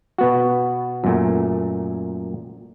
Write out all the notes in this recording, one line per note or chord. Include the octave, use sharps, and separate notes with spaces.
B2 B3 F#4
F#2 A#2 A3